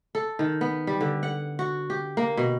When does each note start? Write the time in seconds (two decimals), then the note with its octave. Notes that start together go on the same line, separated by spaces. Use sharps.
0.15 A4
0.39 D#3
0.61 B3
0.87 G3
1.01 D3
1.23 F#5
1.59 F#4
1.90 G4
2.17 A#3
2.37 B2